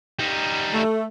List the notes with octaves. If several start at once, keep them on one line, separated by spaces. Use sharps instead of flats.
G3 D#4
A3